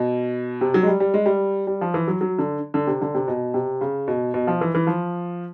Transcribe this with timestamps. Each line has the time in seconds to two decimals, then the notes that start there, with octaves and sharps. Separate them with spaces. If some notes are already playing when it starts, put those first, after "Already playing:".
Already playing: B2
0.61 C3
0.74 F#3
0.83 G#3
0.88 G3
1.00 G3
1.14 G#3
1.26 G3
1.67 G3
1.81 F3
1.94 E3
2.08 F#3
2.21 F#3
2.38 D3
2.74 D3
2.87 C3
3.01 D3
3.14 C3
3.28 B2
3.54 C3
3.81 C#3
4.08 B2
4.34 B2
4.47 F3
4.61 E3
4.75 E3
4.87 F3